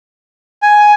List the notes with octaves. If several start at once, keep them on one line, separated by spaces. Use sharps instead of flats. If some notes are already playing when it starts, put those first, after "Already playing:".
G#5